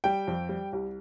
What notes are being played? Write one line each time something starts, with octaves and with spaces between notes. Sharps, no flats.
G3 G5
F2
G3
C2